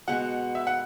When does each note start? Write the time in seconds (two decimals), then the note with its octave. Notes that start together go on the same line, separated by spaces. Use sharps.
0.08 B2 G#3 B3 F#4 F#5
0.55 E5
0.67 F#5